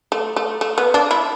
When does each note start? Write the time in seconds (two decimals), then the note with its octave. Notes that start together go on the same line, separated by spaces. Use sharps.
0.12 A3
0.36 A3
0.61 A3
0.78 B3
0.94 D4
1.11 E4